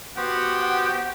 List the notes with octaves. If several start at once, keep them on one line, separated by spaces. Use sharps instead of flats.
B3 F#4 G4 C5 F#5